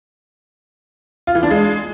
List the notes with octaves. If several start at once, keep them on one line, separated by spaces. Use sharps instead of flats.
F4
E3
D4
G#3